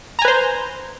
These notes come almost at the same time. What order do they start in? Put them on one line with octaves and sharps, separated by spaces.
A#5 G#5 B4 C5